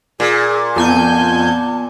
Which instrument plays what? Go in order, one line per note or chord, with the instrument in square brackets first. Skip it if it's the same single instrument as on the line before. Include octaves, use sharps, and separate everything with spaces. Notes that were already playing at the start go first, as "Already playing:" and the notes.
[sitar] A#2 [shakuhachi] G#4
[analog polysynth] F2 G#5 G6 [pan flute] B3 [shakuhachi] A5